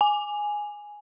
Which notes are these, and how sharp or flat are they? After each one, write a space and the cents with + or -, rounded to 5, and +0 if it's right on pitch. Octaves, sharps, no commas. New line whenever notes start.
G#5 +0